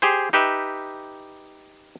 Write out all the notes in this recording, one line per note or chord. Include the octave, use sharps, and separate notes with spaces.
G4 G#4 C5
D#4 G4 B4 E5